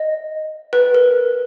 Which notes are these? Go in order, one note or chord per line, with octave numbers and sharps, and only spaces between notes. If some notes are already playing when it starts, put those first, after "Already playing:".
Already playing: D#5
B4
A#4